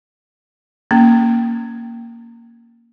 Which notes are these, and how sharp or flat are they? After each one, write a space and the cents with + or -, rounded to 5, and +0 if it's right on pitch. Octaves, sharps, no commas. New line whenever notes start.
A#3 +0 C#4 +0